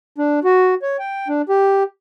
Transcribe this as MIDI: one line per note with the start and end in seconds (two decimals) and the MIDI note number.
0.18 0.39 62
0.44 0.74 66
0.82 0.97 73
0.99 1.28 79
1.28 1.42 62
1.49 1.83 67